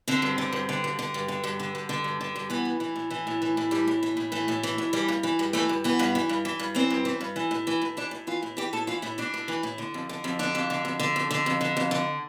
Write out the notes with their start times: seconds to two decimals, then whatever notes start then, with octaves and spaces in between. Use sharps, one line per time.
0.08 D3 C4
0.22 G2
0.38 D3
0.53 G2
0.69 D3
0.84 G2
0.99 D3
1.14 G2
1.28 D3
1.44 G2
1.59 D3
1.75 G2
1.89 D3
2.04 G2
2.21 D3
2.36 G2
2.50 E3 B3
2.65 A2
2.80 E3
2.96 A2
3.10 E3
3.27 A2
3.42 E3
3.57 A2
3.71 E3 G3
3.88 A2
4.03 E3
4.17 A2
4.32 E3 A3
4.48 A2
4.63 E3
4.78 A2
4.93 E3 G3
5.08 G2
5.23 E3
5.39 G2
5.53 E3 A3
5.69 G2
5.84 E3 B3
5.99 G2
6.15 E3
6.29 G2
6.45 E3
6.59 G2
6.75 E3 C4
6.90 G2
7.05 E3
7.21 G2
7.36 E3
7.51 A2
7.67 E3
7.82 A2
7.97 E3 D4
8.11 A2
8.27 E3 F4
8.43 A2
8.57 E3 G4
8.73 A2 A4
8.87 E3 F4
9.02 A2 E4
9.18 E3 D4
9.34 A2
9.48 E3
9.63 A2
9.78 D3
9.94 F2
10.09 D3
10.24 F2
10.39 D3 D4
10.55 F2
10.70 D3
10.85 F2
10.99 D3
11.16 F2
11.31 D3
11.46 F2
11.61 D3
11.77 F2
11.91 D3